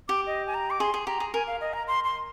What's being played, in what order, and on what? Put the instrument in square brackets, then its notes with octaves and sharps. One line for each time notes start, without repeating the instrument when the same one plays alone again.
[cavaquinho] G4 [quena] D6
[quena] D#5
G#5
A#5
D6
[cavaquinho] G#4 [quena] C6
[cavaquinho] G#4
[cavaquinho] G4 [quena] A#5
[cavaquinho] G#4
[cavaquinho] A#4 [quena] G#5
[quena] F5
D#5
A#5
C6
C6